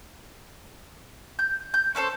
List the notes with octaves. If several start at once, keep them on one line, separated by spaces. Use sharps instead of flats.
G6
G6
C#4 D4 A4 C5